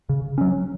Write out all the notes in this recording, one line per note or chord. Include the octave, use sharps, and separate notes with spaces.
C#3
F#3 C#4